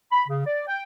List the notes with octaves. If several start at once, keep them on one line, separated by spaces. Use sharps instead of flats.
B5
C#3
D5
G5